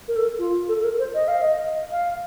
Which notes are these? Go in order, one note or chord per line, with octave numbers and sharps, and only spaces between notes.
A#4
A4
A#4
F4
A4
A4
A#4
C5
D#5
F5
D#5
F5